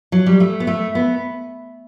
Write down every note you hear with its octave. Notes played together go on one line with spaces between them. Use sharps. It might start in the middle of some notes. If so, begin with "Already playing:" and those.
F#3
G3
A3
B3
A3
B3